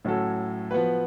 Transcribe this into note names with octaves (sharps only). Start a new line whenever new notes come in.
A2 F#3 C#4 F#4 A4
F3 B3 F#4 B4